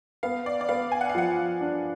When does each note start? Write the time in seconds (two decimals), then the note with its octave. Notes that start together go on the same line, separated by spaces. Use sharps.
0.23 B3 F5
0.46 D5
0.61 D5
0.69 B3 F5
0.92 G#5
1.01 F#5
1.09 F5
1.15 F3 F#5
1.61 D4